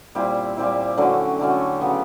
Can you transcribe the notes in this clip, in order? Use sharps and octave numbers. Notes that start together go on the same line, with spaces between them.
A#2 G3 C4 E4
A#2 G3 C4 E4
D3 F#3 A3 C#4
D3 F#3 A3 C#4
C#3 F#3 B3